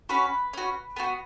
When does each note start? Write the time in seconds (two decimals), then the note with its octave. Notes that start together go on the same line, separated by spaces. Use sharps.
0.09 C#4 F#4 B4
0.53 C#4 F#4
0.96 B3 D#4 F#4